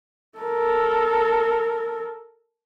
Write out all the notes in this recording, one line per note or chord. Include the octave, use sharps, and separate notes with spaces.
A4 A#4